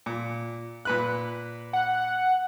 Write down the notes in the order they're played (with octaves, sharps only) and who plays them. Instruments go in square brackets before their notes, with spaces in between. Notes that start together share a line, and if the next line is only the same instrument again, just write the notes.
[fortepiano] A#2
A#2 B4 F#6
[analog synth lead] F#5